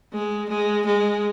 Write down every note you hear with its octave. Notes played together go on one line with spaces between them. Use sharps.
G#3
G#3
G#3